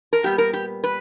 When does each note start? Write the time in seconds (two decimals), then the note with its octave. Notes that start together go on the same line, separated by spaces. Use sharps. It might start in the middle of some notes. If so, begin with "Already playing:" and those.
0.13 A#4
0.23 A#2 G3 B3 G4
0.38 A#4
0.53 G4
0.84 B4